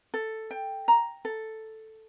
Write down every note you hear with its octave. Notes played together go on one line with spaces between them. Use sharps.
A4
G5
A#5
A4